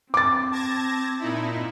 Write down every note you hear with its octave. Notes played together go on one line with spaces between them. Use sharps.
C4 D6 A6
A5 G#6 A#6
A#2 D#4 E4